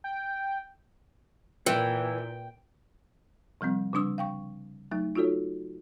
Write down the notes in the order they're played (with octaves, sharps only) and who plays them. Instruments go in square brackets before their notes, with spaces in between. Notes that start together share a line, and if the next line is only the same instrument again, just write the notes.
[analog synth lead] G5
[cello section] A#2 [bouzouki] E3 [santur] G5
[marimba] C3 F3 G3 C4
C#3 G3 D4 D#6 E6
F5 G5 C#6
F#3 A3 D#4
D#4 F4 F#4 A4 C#5